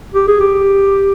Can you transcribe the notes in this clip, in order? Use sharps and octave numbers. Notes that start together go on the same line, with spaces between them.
G4
G#4
G4